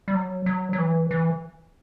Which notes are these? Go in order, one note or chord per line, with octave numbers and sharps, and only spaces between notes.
G3
F#3
F#3
F#3
E3
E3